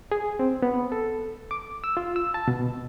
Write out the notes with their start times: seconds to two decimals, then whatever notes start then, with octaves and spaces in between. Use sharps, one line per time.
0.12 G#4
0.39 C4
0.62 B3
0.92 A4
1.51 D6
1.84 E6
1.97 F4
2.16 E6
2.34 A5
2.48 B2